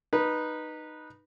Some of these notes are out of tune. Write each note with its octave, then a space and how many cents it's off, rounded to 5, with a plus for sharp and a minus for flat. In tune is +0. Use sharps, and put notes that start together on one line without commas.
D#4 -15 B4 -15